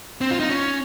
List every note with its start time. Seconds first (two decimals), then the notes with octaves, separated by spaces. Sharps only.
0.21 C4
0.31 F4
0.40 D#4
0.49 C#4